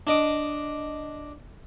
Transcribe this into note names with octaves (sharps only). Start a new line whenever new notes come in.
D4 D#5 D6